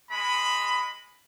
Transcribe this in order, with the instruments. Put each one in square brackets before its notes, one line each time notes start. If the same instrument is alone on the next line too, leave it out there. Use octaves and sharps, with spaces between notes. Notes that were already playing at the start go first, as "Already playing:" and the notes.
[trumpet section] G#3 B5